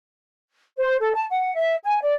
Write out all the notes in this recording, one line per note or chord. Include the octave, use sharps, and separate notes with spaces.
C5
A4
A5
F#5
E5
G#5
D5